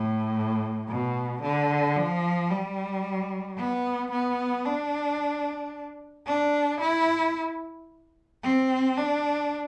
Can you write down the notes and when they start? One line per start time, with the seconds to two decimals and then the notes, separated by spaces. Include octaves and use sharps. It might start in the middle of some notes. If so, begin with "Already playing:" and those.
Already playing: A2
0.88 B2
1.42 D3
1.96 F3
2.50 G3
3.58 B3
4.11 B3
4.66 D4
6.27 D4
6.81 E4
8.43 C4
8.97 D4